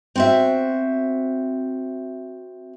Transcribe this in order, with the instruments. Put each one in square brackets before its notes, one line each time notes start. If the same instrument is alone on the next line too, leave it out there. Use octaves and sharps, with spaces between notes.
[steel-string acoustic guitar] C4 F#4 E5